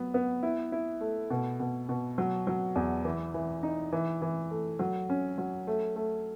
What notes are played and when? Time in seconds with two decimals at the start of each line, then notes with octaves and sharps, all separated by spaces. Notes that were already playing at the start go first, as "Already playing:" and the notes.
Already playing: F#3 B3
0.14 B3
0.43 E4
0.72 E4
1.01 A3
1.30 B2
1.60 B2
1.89 B2
2.18 F#3
2.47 F#3
2.75 E2
3.05 E3
3.34 E3
3.63 D#4
3.93 E3
4.22 E3
4.51 A3
4.79 F#3
5.09 C#4
5.38 F#3
5.67 A3
5.96 A3